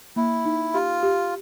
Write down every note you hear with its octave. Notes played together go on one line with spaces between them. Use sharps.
A#3 E4
D#4
F4 G4
G4